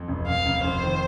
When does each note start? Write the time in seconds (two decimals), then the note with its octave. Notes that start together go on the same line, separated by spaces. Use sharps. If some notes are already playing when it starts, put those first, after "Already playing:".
Already playing: F2
0.08 F1
0.27 F1 F5
0.46 F1
0.64 F1 C5
0.83 D#3